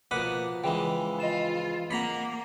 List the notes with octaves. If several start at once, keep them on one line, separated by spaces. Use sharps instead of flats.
B2 F3 A#3 F#5 B5 D6 D#6
C#3 E3 G#3 G5
F4 D#5 E7
A#3 F#5 A#5 B5